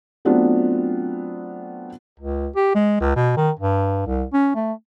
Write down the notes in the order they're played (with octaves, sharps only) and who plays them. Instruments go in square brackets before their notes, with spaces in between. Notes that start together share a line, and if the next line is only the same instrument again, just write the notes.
[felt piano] F#3 A3 B3 C4 D4 F4
[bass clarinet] C#2
G4
G#3
C#2
B2
D#3
G2
C2
C#4
A3